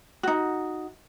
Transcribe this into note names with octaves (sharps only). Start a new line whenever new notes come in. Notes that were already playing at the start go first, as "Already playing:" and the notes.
D#4 F#4